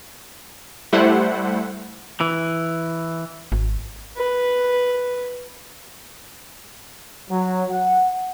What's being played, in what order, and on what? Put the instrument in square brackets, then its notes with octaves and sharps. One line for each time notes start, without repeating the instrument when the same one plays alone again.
[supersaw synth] G3 A3 E4 C5 F#5
[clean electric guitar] E3
[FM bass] G#1
[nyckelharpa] B4
[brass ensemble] F#3
F#5